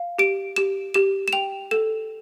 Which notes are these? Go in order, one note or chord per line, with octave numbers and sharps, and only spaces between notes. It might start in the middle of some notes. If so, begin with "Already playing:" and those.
Already playing: F5
G4 D7
G4 E7
G4 E7
E7
G5 F7
A4 E7